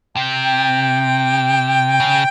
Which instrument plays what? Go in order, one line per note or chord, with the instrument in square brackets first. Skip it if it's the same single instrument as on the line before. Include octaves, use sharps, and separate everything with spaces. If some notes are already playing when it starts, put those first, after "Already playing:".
[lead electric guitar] C3 [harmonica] G5
[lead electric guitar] C#3